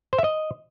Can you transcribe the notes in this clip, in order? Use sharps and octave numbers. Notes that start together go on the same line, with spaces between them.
C5
E5
D#5